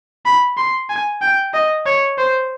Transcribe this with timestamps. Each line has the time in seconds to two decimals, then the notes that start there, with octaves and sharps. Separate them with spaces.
0.26 B5
0.57 C6
0.90 G#5
1.22 G5
1.54 D#5
1.86 C#5
2.18 C5